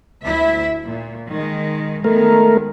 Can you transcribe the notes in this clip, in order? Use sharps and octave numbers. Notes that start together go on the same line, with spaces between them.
D2 E4 E5
A#2
D#3 G#3
D#3 G#3 A3 B3 A#4